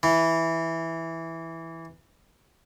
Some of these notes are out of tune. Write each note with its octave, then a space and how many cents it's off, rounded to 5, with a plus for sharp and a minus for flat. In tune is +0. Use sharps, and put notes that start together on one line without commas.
E3 -5